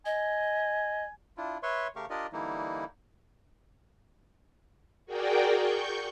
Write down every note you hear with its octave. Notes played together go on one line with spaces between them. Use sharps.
D#5 G#5
D4 E4 F4
B4 C#5 E5 C6 C#6
C#3 A3 G4 A#4 F5 C#6
D4 F4 G4 A#4 D5 D#5
D3 E3 G3 A#3 D#4 E4
F#4 G#4 A#4 D5 G5
C#6 G6